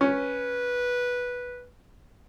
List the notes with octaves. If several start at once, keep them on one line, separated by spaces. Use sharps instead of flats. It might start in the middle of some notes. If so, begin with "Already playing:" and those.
C#4 B4